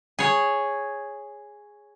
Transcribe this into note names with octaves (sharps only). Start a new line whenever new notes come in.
G#4 C#5